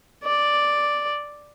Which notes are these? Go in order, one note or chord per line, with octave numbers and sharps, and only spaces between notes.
D5